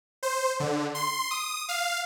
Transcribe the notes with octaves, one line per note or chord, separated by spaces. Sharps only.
C5
D3
C6
D#6
F5